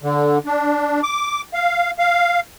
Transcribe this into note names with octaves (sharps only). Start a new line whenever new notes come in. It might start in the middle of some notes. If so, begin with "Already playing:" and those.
D3
D4
D6
F5
F5